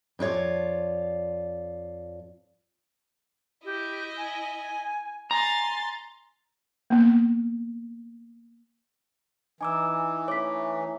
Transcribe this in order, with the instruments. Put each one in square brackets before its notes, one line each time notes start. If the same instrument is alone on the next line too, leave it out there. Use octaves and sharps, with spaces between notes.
[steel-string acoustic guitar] F2 D4 F4 C#5 D5
[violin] E4 D#5 [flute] G4
[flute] G#5
[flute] G#5 [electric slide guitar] A#5 [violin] C6 A6
[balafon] A#3 B3
[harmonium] E3 [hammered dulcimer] D#4 [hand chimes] G#5 D6 E6
[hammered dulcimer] A3 C#4 [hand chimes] C#5 [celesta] D6 B6